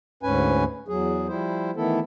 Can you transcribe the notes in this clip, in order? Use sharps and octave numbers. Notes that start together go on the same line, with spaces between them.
D2 G#2 C#4 B4 G#5
E2 F#3 G#4
F3 G3 E4 C5
D#3 E3 A3 B3 E4 A4